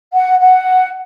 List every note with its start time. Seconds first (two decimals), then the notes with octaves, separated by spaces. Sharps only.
0.13 F#5
0.40 F#5